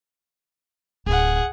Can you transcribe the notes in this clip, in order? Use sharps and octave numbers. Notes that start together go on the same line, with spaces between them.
D1 G#4 F#5